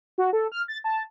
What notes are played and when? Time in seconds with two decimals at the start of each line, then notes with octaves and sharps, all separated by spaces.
0.18 F#4
0.33 A4
0.52 F6
0.68 A6
0.84 A5